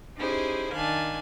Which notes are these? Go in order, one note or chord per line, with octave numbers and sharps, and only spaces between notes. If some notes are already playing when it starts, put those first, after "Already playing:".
C#4 D#4 E4 G4 G#4 C5
D#3 D4 F5 G#5 A5 F#6